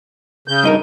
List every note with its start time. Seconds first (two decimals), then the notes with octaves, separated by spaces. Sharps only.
0.48 C#3 G6
0.63 G2 D#4 A#4